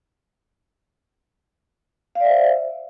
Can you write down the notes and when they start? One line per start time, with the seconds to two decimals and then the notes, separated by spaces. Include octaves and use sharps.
2.15 F5
2.20 D5
2.25 E5
2.30 C5